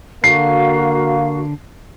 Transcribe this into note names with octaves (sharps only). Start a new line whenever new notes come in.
D3 A#3 F#4 F5 C7